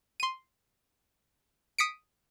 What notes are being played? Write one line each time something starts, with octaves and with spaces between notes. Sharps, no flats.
C6 D#7
D#6 B6 C#7 D7